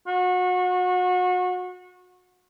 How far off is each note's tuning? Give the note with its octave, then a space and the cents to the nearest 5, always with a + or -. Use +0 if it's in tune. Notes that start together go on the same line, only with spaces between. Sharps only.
F#4 -30